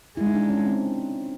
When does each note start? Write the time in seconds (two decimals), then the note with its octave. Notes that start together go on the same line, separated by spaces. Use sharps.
0.17 G#3 E4
0.27 D#4
0.34 D4
0.50 C#4
0.67 C4